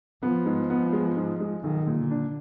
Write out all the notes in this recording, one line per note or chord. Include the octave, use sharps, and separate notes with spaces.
F3 B3
G#2
B3
G#3
G#2
G#3
B1 D#3
A#2
D3
D4